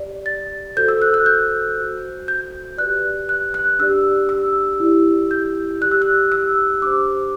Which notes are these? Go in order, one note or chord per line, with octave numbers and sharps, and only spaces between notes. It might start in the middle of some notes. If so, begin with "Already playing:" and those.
Already playing: G4 D5
A6
F#4 A4 C5 G6
E6
F#6
F#6
G6
F#4 C5
G6
G4 B4 D5 F#6
F#6
F#6
D4 G4 D5 E6
E6
E4 G4 D5
G6
G4 D5 F#6
E6
F#6
E6
D4 G4 C5 D6